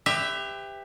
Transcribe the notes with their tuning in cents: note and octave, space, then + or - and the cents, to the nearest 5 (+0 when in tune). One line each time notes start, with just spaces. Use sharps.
G4 +20 B4 +40 E5 +0